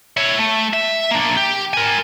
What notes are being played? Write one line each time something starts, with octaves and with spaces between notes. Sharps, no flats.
E4 C#5
A3
E5
A#3 D4
G4
A#4 G#5